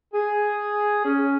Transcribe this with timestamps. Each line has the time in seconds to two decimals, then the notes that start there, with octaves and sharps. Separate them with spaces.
0.14 G#4
1.04 C#4